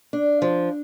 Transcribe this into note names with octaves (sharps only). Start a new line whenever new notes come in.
D4
F3